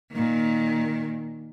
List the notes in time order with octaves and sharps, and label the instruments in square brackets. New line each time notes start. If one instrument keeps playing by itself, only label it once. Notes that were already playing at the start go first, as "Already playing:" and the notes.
[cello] A#2 D#3